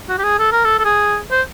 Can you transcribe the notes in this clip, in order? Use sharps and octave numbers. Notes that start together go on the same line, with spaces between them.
F#4
G4
G#4
A4
A#4
A4
A4
G#4
C5